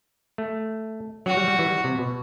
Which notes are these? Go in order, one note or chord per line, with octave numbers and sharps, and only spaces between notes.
A3
F#3 F#4
G3
G3
E3
G3
C3
B2